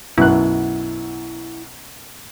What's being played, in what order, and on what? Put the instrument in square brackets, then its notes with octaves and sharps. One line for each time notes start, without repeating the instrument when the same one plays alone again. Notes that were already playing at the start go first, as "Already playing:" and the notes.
[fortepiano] B1 F#2 F#6 [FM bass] E4